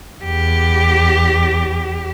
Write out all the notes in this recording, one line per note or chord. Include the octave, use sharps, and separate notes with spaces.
E2 G4